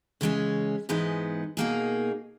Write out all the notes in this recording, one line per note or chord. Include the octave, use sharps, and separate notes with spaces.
C#3 E3 G#3 C#4
G#2 E3 G#3 B3 D#4
B2 A#3 D#4 G#4